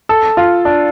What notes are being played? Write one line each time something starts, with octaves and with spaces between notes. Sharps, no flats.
A4
F4
D4